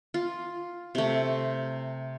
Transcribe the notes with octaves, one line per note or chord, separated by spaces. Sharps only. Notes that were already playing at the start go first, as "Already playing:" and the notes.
F4
C3 A3